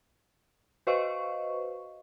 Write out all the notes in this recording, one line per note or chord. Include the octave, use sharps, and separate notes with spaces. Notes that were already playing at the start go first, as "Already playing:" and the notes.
F#4 B4 C5 D#5 F5 C#6